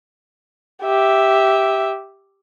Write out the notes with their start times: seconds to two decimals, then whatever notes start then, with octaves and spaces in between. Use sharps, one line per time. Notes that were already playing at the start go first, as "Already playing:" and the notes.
0.83 G4 E5